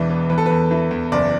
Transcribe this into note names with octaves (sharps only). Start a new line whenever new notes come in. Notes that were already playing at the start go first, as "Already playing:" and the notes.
Already playing: E1 E2 E3 D5
B3
E2 B4
A4
E2 B4
E3
E2
F#1 D5